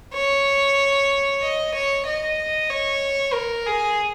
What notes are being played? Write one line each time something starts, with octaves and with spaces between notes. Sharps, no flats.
C#5
D#5
C#5
D#5
C#5
A#4
G#4